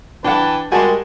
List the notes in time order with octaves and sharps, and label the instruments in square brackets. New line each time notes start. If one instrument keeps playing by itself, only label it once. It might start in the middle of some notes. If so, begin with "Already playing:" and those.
[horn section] E3 B4 A5 [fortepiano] D4 F#5 [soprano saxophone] G5
[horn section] G3 G#3 [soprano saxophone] F#4 [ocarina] A#4 [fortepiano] G#5 A5